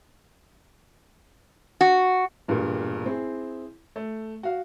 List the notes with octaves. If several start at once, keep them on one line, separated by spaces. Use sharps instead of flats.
F#4
E1 G2 A#2
C4 E4 G#4
A3
F#4 F5